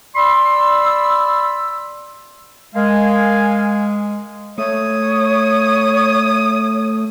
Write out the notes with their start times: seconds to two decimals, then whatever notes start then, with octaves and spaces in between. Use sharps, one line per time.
0.16 D5 B5 C6 E6
2.75 G#3 A#4 F5 G#5
4.58 A3 C#5 D#6